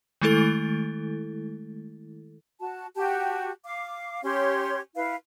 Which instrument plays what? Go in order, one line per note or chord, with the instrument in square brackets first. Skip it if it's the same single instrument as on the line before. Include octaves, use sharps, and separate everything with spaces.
[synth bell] D#3 G#3 A3 E4 A4 A6
[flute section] F#4 A5
F#4 G4 G5 A5
F5 D6
C#4 G4 C#5 C6
E4 B4 F5